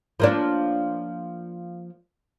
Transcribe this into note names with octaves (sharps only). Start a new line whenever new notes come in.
F3 A#3 D4